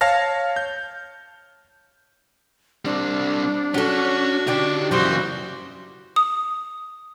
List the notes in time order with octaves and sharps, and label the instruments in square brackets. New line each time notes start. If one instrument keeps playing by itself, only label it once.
[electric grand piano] C#5 F5 A5 F6 A#6
G6
[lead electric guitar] G3 C4 [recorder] D4
[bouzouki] F#3 A4 [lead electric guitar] C#4 [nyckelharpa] F#4
[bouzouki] D3 G4 A4 [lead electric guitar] D#4 D5
[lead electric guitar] F#2 C#3 [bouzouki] E3 G3 E4 [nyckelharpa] F#4 C5
[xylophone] D#6